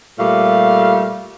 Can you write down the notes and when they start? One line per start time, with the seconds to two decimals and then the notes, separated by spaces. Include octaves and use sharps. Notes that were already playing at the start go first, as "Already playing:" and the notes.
0.19 A#2 G3 A3 F5